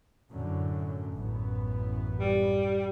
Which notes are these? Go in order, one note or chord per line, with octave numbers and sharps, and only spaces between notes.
F#2 A2 D3
A1 F#2 B3
G3